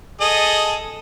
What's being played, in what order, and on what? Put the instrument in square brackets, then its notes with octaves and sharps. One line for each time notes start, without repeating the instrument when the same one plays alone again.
[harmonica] G#4 A4 D#5